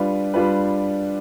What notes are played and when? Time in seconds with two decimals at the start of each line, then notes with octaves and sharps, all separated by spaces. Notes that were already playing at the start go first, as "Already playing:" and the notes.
Already playing: G3 D4 F4 B4
0.34 G3 D4 F4 B4